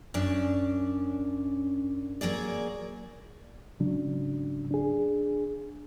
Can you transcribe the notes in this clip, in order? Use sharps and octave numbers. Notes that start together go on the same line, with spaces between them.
F#2 C#4 D4 D5
F#3 A#3 G#4 D5
G#2 C#3 F#3 D4
D4 G#4